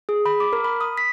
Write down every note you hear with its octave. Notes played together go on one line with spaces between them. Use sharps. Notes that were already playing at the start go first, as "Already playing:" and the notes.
G#4
B5
D6
A#4
B5
D#6
B6